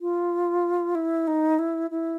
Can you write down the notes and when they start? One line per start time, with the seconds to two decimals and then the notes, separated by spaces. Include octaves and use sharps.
0.01 F4
0.95 E4
1.27 D#4
1.59 E4
1.91 E4